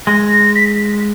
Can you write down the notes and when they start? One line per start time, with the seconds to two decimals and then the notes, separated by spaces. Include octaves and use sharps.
0.07 G#3 A#6
0.56 B6